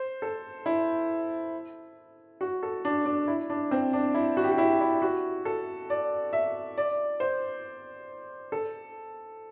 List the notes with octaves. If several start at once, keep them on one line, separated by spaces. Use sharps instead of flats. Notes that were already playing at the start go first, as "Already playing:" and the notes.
Already playing: C5
A4
E4
F#4
A4
D4
D4
E4
D4
C4
D4
E4
F#4
G4
F#4
E4
E4
F#4
A4
D5
E5
D5
C5
A4